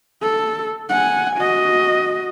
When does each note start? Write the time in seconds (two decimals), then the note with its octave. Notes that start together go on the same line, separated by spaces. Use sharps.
0.22 A4
0.90 F#5 G#5
1.36 F#4 D#5